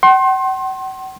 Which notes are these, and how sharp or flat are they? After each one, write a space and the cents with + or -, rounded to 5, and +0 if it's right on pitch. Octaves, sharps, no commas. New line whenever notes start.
F#5 +45 C6 +30